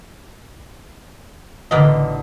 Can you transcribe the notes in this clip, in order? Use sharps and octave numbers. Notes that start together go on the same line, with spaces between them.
A1 D3 B3 A#4 D#5